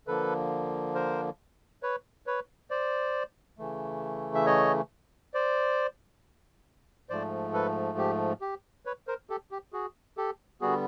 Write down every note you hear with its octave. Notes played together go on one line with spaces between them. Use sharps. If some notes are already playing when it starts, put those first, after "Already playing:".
D3 F3 A#3 A4 B4
A#4 C5
B4 C#5
B4 C#5
C5 D5
C#3 E3 A3
E5
C#5 D#5
C5 D5
G#2 F3 A3 C5 D5
A4 B4
G4
G4
B4 C#5
A#4 C5
G4 A4
G4
F#4 G#4
G4 A4
D3 G3 B3 F#4 G#4